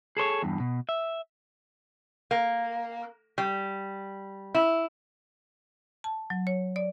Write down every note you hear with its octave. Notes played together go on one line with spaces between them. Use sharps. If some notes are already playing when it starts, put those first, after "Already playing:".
G#4 A4 C5 C#5
E2 G2
B2
E5
A#3
G3
E4
A5
F#3
C#5
D5